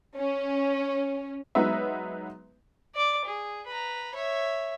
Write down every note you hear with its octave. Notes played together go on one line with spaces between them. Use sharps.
C#4
F#3 G#3 B3 D#4 B4 E5
D5 D6
G#4
B4 A#5
C#5 E5